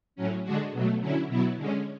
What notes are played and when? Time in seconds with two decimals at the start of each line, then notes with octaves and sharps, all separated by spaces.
0.16 A2 F#3 C#4
0.43 D3 G#3 D4 F#4
0.71 B2 F#3 A3
1.00 D3 F#3 C#4 E4
1.28 B2 F#3 B3 E4
1.57 D3 G#3 C#4